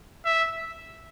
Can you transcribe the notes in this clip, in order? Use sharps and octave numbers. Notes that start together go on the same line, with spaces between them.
E5